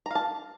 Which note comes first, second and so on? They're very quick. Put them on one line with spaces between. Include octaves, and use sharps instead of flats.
A#5 F5 A5